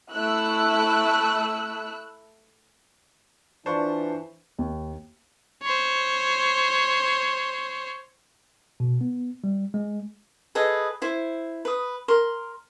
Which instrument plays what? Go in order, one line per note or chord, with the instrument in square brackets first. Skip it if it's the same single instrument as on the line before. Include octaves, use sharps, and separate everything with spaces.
[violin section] A3 E4 E6 F#6
[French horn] E3 [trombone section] D4 [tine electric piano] F4 B4 A5 [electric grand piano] C5 C#6
[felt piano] D#2
[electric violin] C5 C#5
[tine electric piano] B2
B3
G3
G#3
[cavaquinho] G#4 A4 B4 D#5
E4 C5
B4 D#6
A#4 C6